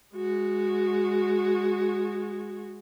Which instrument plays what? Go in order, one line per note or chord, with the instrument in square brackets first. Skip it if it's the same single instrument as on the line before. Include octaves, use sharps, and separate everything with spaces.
[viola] G#3 F#4